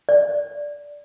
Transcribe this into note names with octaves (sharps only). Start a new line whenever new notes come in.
D5